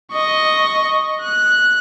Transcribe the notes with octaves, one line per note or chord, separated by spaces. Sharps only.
D#5 C#6
F#6